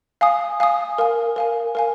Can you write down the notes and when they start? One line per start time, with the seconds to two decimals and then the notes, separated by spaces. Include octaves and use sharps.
0.21 F5 G#5 D#6
0.60 F5 G#5 D#6
0.98 A#4 F5 G#5
1.36 A#4 F5 G#5
1.75 A#4 F5 G#5